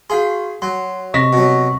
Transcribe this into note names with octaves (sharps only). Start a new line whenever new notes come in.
F#4 G#4 F5 C6
F#3 C6
C3 D#5 C#6 A#6 B6
B2 F#3